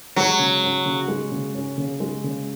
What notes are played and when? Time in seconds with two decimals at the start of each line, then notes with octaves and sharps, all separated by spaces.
0.16 F#3 G#3
0.39 C#3
0.63 C#4
0.86 C#3
1.08 G#3
1.32 C#3
1.55 C#4
1.78 C#3
2.00 G#3
2.24 C#3